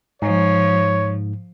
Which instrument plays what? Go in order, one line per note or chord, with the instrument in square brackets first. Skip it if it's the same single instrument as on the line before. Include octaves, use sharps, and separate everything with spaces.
[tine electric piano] G#2 [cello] F3 [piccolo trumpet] C#5